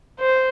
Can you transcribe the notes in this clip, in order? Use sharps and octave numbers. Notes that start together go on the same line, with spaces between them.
C5